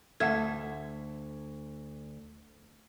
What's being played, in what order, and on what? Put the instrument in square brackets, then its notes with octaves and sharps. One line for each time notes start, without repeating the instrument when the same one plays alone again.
[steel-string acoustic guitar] D2 [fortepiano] A4 E5 [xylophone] F#5 G#6